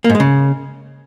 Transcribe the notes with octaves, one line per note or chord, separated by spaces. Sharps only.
A#3
G#2
G#3
C#3